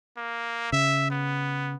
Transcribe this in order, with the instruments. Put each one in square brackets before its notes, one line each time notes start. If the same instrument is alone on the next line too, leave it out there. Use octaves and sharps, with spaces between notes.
[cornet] A#3
[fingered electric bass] C#3 [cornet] E5
[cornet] B3